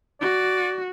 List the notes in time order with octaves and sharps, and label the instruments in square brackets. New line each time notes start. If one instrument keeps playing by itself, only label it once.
[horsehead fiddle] F#4 [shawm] D5